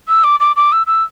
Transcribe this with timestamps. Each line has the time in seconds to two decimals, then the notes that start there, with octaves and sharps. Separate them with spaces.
0.08 E6
0.24 D6
0.40 D6
0.56 D6
0.72 E6
0.87 E6